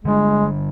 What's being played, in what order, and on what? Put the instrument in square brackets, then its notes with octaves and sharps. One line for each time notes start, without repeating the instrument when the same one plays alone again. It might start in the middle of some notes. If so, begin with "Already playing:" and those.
[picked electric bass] D3 G3 D4 [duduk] G#3